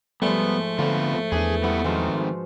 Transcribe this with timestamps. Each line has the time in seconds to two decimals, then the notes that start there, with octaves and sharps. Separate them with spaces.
0.22 G#2 F3 G3 A3 B3
0.79 D3 B3 C4 F4
1.32 E2 D4 G#4 B4
1.63 G3 B3 E4 F#5
1.84 G#2 D#3 F3 C4 F#4